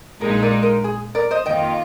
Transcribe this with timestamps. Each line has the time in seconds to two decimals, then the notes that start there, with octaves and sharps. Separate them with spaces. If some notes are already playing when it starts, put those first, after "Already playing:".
0.21 A#1 A#2 G#3 D#4 A#4
0.42 A#4 D5
0.63 A#4
0.84 G#4
1.15 A#4 D5
1.31 C5 D#5
1.46 F2 D#3 A#3 F4 D#5 G5